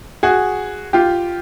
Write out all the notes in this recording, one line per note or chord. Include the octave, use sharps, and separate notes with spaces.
F#4 G#4
F4 G4